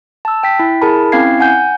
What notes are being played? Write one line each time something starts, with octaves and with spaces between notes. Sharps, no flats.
A5 E6
G5 B6
E4
E4 G#4 A#4 A5 B5
C4 C#4 E4 F5 G#6 C7
F#5 G#5 G6